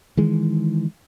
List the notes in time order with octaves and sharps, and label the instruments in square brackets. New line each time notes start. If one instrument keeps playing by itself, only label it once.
[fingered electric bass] D#3 E3 G#3